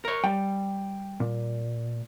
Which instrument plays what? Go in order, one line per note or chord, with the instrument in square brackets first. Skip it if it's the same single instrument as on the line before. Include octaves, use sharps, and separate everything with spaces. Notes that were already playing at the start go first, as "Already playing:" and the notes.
[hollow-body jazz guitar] A#4 C#5
[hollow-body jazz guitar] G3 [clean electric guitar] G5
[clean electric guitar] A#2